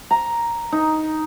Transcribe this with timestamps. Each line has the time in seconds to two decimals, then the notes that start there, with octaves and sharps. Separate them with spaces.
0.11 A#5
0.72 D#4